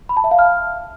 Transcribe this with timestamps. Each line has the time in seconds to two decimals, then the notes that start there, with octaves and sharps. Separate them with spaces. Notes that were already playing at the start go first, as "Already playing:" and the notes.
0.09 B5
0.17 A5
0.24 E5
0.31 F5
0.39 F6